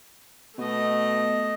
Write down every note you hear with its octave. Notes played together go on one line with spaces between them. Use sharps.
B2 A3 D#5